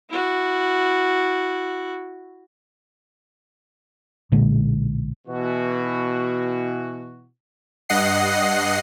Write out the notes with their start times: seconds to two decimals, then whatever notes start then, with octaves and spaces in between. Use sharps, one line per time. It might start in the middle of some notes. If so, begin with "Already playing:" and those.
0.10 E4 F#4
4.32 B1 A#2 D3 G#3
5.27 B2 E3 F#4
7.89 G2 D#5 F#5 C7